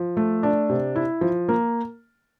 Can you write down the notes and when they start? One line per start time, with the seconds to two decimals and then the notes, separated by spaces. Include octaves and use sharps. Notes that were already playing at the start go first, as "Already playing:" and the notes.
Already playing: F3
0.17 A3
0.43 D4
0.69 C3
0.96 E4
1.21 F3
1.49 A#3